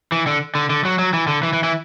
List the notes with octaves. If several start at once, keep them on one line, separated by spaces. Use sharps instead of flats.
E3
D3
D3
D3
F#3
F#3
E3
D3
E3
E3
E3